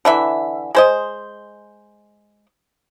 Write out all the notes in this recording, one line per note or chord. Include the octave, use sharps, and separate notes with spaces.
D3 E3 E5
G#3 C5 D#5